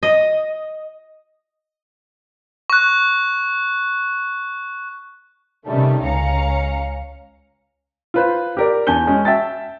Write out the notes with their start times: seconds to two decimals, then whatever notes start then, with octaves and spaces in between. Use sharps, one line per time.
0.03 D#5
2.70 C#6 F#6
5.67 C3 D#3 G3 A3 C#4
6.05 C#2 C#4 F5 A#5 C#7
8.14 F4 B4 C5
8.57 G4 A#4 D5
8.87 E2 G#5 A5 G6 G7
9.07 G#3 C#4
9.25 E5 G5 A5 A6